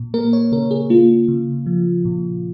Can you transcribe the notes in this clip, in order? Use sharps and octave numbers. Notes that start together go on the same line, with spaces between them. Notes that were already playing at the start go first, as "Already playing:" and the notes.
Already playing: A#2
A#3 A#4
C#5
C#3 A#4
G#4
A#3 F4
C#3
F3
A#2